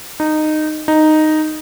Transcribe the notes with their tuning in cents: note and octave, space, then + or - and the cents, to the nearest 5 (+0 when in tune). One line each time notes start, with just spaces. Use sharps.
D#4 -15
D#4 -5